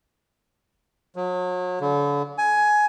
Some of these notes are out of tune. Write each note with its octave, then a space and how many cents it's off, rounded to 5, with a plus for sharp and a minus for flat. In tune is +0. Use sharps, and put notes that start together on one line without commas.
F#3 -35
D3 -40
G#5 +15